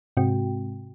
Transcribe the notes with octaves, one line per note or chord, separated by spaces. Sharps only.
G#2 C3 G#3 C4 F#4 G5